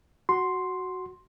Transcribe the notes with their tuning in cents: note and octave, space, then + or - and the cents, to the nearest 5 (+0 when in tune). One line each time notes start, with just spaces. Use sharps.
F#4 +0 C6 +0